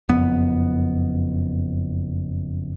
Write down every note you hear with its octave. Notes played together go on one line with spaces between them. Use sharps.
F#1 F2 B3